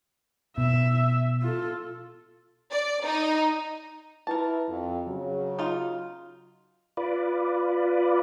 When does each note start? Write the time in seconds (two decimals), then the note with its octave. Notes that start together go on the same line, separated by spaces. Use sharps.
0.58 B2 E5
1.42 F4 A4
2.72 D5
3.05 D#4
4.27 E4 A#4 B4 A5
4.68 F2
5.05 C#3 F#3
5.59 D#4 F4
6.97 F4 B4 D5